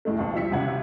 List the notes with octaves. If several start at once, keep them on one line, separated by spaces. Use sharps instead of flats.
F1 A2 G#3 A3
G#1 D#2 B2 C4 A5
F3 G3 E4 E5 B6 C#7
G#1 D#2 C3 C#4 F#5 G#6